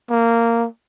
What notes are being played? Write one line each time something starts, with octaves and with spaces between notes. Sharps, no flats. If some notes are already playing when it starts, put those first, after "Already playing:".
A#3